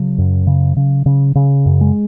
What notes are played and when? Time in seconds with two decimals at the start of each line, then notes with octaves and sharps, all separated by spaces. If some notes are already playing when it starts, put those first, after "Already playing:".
Already playing: C#3 F#3
0.18 F#2
0.47 C#3
0.77 C#3
1.06 C#3
1.35 C#3
1.66 F#2
1.81 G#3